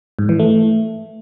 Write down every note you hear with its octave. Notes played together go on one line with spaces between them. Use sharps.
G#2
E3
A3